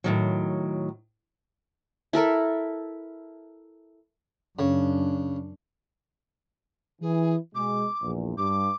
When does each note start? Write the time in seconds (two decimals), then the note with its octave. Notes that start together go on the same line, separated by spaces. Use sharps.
0.04 A2 D#3 F#3
2.13 E4 A4 A#4 E5
4.59 F#2 C#3 D4
7.02 E3 G#4
7.55 B2 G#3 D6
8.02 A#1 E2
8.37 G2 D6